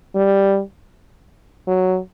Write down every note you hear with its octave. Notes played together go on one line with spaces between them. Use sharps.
G3
F#3